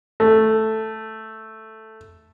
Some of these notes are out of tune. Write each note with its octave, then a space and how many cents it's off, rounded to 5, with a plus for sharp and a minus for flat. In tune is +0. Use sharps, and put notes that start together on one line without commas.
A3 +0